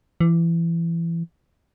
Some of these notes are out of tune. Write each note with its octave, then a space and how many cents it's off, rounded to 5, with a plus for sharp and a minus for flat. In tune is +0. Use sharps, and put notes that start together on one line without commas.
E3 +25